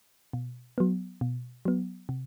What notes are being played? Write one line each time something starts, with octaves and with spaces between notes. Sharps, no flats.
B2
F#3 B3
B2
F#3 B3
C3